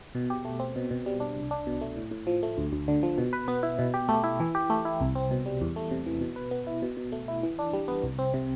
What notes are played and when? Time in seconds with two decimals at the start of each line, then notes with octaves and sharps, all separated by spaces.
0.15 B2
0.30 G4
0.45 A3
0.60 C4
0.76 B2
0.91 B2
1.06 G3
1.20 D4
1.36 C2
1.51 D4
1.67 B2
1.81 A3
1.96 A2
2.11 A2
2.27 F3
2.43 A3
2.57 D2
2.72 D2
2.88 D3
3.03 F3
3.18 B2
3.33 B4
3.48 B3
3.63 E4
3.79 B2
3.94 G4
4.09 A3
4.24 E4
4.40 E3
4.55 G4
4.70 A3
4.85 E4
5.01 C2
5.15 C4
5.31 B2
5.46 G3
5.61 E2
5.76 A3
5.91 C3
6.06 E3
6.21 B2
6.36 B4
6.51 B3
6.67 E4
6.82 B2
6.97 B2
7.12 A3
7.28 E4
7.43 E3
7.59 D4
7.73 G3
7.88 B3
8.03 C2
8.19 C4
8.34 C3